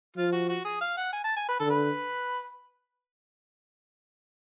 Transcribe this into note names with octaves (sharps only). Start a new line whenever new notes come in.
F3 F4
F#4
F#4
G#4
F5
F#5
G#5
A5
G#5
B4
D3 A4
B4